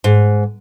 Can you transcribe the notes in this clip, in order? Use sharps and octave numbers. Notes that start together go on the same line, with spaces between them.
G#2